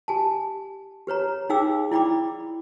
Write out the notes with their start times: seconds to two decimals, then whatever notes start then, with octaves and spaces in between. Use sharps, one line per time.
0.08 G4 G#5 A5
1.07 G4 B4 C#5 A#5
1.50 D#4 G#4 F5 G5 D6 E6
1.91 E4 D5 G5 B5 D6